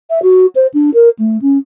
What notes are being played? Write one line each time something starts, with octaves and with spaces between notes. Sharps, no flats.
E5
F#4
C5
D4
A#4
A3
C#4